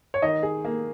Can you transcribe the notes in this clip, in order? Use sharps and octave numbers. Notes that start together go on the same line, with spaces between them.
C#5
D#3 D#5
G#4
A#3